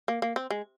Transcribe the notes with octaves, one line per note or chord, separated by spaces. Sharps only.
A#3
A#3
C4
G#3